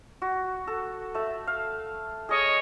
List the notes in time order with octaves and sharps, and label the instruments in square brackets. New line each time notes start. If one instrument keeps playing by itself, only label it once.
[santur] F#4
A4
A3 E5
F5
[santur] G#4 D#6 [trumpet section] C#5 D#5